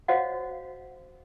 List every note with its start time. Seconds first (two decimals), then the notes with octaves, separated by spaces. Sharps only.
0.08 F#4 C5 C#5 D#5 F5 F#5